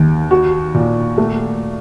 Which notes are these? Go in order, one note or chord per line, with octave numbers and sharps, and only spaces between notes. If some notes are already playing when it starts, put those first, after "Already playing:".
Already playing: D#2
F#4
A#2
A3